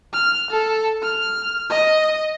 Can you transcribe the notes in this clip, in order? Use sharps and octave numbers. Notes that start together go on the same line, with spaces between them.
F6
A4
F6
D#5